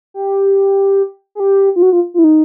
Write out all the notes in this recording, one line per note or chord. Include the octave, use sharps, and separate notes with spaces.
G4
G#4
G4
F4
F#4
F4
F4
E4
D#4